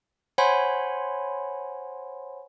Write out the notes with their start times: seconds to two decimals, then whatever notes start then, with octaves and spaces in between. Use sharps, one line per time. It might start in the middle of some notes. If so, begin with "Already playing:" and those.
0.38 C5 C#5 F#5 G#5 B5 C6